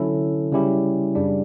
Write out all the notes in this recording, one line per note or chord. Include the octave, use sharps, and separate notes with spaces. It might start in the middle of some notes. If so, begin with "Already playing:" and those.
Already playing: D3 F#3 C#4 E4 A4
C#3 G3 C#4 E4 G4
F#2 C#3 G3 D4